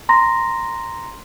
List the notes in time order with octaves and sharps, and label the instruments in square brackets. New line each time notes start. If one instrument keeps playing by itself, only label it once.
[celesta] A#5 C6 A#6